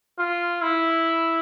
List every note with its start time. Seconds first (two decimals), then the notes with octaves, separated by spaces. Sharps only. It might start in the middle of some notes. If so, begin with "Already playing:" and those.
0.18 F4
0.62 E4